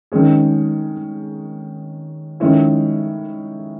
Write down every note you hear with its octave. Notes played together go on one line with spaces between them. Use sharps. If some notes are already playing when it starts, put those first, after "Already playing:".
D#3 G#3 C#4 G#4
D#3 G#3 C#4 E4